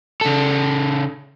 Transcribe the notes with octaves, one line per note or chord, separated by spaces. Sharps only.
C#3 A4